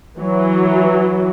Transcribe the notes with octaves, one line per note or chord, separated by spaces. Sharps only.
E3 F#3